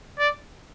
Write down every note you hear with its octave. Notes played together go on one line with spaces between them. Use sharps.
D5